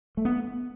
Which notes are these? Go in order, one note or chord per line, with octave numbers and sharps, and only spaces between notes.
A3
B3